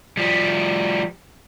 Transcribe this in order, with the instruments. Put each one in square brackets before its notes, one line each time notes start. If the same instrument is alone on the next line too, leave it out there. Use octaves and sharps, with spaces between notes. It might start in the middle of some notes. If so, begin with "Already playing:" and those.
[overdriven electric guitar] F3 G3